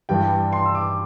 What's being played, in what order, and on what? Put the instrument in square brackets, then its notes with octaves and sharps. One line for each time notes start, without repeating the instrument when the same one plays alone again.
[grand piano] G2 E3 G3 G5
C6
E6
D6